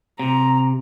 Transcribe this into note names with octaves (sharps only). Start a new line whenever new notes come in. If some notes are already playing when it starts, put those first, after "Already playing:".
C3 A#5